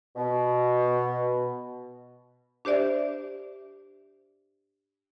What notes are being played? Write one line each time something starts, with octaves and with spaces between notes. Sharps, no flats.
B2
D4 G4 C5 D5 E5